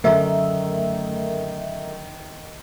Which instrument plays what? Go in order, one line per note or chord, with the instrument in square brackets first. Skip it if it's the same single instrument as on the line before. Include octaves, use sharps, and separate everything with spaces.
[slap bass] F#2 D3 F#3 [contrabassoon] D#3 [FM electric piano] A3 A#4 E5